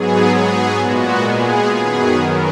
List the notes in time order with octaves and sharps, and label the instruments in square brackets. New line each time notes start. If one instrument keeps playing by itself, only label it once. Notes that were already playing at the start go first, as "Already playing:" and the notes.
Already playing: [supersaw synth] G#2 F#3 B3 G#4
G#4
A#2 G#3 B3 F#4
G#4
F#2 D#3 F#3 B3 G#4
A#4